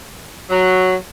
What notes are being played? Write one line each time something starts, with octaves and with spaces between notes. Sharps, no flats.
F#3